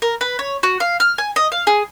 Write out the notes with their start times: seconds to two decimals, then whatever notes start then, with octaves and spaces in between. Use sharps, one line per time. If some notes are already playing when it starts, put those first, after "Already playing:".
0.02 A#4
0.21 B4
0.39 C#5
0.63 F#4
0.80 F5
1.00 F6
1.18 G#5
1.36 D#5
1.52 F5
1.67 G#4